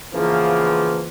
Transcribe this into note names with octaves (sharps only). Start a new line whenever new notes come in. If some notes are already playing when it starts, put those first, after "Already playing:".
C#3 E3 F3 A#3 B3